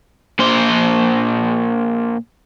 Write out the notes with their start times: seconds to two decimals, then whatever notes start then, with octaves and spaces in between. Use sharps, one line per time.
0.40 A#2 C5